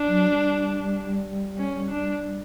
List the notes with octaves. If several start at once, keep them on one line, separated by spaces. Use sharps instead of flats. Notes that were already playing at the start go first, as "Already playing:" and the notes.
Already playing: D4
F#3
G3
C#4
D4